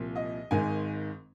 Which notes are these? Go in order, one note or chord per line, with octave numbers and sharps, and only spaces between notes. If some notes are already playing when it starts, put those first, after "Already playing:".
Already playing: C2 A#2 F3
D#5
G#1 G#2 D#3 G#3 G#5